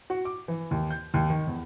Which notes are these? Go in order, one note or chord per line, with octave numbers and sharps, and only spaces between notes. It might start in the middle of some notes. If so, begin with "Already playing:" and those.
F#4
D6
E3
D#2
G6
D#2
D#3
E2